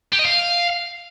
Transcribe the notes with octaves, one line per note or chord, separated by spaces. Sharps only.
G4
D#5
F5